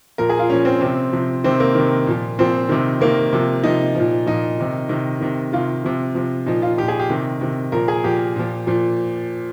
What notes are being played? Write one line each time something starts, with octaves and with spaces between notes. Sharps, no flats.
A#2 F3 A#4
G#4
F4
A#2 F3 C#4
C4
C3 F3 C4
C3 F3
C3 D#3 C4
A#3
C3 D#3
A#2 F3
A#2 F3 C4
C3 D#3
C3 D#3 A#3
C3 F3
C3 F3 D#4
A#2 F3
A#2 F3 D#4
C3 D#3
C3 D#3
C3 D#3
C3 D#3 F4
C3 F3
C3 F3
A#2 F3 D#4
F4
A#2 F3 G4
G#4
G4
C3 D#3
C3 D#3
A#2 F3 A#4
G#4
A#2 F3 G4
A#2 F3
A#2 F3